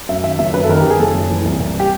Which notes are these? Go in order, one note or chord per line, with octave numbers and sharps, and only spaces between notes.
F#2 E5
D#3 E5
F#1 E5
F#2 B4
A4
D#3 A#4
G4
D#3
G#4
F#1 A4
F#1
E3
C2
C2
G4